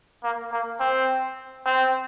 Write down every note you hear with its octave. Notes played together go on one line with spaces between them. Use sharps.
A#3
A#3
C4
C4